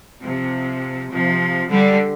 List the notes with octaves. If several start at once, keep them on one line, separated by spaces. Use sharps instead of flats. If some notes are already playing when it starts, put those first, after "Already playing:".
C3 F3
C3 F3
D3 G3